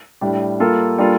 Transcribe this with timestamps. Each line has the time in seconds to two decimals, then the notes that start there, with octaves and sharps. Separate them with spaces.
0.21 A2 G3 D4 G4
0.60 G3 A#3 F4 A4
0.98 G3 A#3 D4 F4 A4